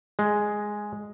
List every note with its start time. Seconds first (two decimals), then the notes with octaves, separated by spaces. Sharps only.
0.19 G#3